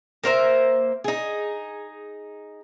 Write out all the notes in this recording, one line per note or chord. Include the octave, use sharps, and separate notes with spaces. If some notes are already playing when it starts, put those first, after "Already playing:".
A#3 A#4 C5 E5
D#4 G#4